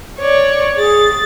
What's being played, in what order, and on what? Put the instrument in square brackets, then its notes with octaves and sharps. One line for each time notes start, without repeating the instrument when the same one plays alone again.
[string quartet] C#5 D5
[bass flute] G#4 [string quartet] A6